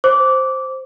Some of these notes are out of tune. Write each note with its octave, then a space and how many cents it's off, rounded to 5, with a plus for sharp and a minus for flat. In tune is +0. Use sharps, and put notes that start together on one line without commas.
C5 +0 D6 -15